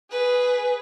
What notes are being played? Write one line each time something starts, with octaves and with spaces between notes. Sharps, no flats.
G#4 B4